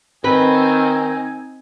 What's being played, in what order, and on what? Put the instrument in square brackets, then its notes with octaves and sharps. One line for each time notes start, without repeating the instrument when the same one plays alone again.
[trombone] D#3 [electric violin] C4 [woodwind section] D#4 G#5 [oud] B4